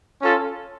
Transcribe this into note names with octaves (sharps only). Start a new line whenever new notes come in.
C#4 F4 A4